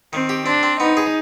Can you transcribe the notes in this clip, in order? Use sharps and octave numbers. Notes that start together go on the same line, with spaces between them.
D#3 C4
G4
C4 D4
C4
B3 D#4
G#4